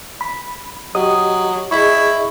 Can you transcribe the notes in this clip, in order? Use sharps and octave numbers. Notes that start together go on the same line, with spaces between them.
B5
F#3 G4 D#5 D#6
E4 G#4 D#5 C#6